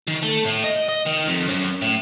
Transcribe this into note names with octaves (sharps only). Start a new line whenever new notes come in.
D#3
A3
A2
D#5
D#5
D#3
F2
F#2
A2